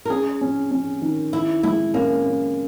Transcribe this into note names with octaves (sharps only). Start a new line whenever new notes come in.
A#4
C#4 G#4
C#4
C#4
D#3
D#3 E4
G#3 E4
A#3 C#4
C#4